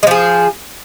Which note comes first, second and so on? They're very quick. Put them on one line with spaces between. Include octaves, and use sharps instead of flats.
G#3 F3 G#4